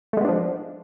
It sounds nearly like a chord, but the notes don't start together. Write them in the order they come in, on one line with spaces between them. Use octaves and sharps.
A3 G#3 B3 D4 F3